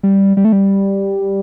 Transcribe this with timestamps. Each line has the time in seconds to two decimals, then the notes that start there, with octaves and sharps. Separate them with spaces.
0.03 G3
0.37 G3
0.45 A3
0.52 G3